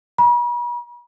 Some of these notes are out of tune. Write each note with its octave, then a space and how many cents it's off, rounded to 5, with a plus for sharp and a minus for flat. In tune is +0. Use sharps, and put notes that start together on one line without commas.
B5 -45